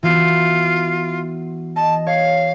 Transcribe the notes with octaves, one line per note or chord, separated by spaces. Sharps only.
E3 B3 F4 F#4
D#5 A5
C#5 F5